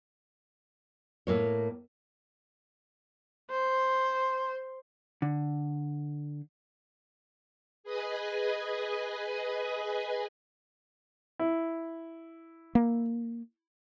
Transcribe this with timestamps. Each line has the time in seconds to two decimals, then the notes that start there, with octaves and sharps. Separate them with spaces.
1.27 A2 A#3 C#5
3.50 C5
5.22 D3
7.84 G#4 B4 D#5 G#5
11.39 E4
12.75 A#3